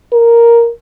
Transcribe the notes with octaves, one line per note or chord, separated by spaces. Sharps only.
A#4